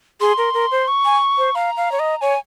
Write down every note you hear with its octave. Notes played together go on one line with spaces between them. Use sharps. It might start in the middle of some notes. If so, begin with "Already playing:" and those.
G#4 C6
A#4
A#4
C5
C#6
G#5
C5
F5 A#5
F5
C#5
D#5
C#5 G#5